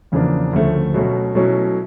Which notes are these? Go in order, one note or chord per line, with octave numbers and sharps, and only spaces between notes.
E2 C#3 F3 A#3 D4
D2 C#3 F3 A3
B2 F#3 A3 C#4 F#4
B2 F#3 A3 C#4 E4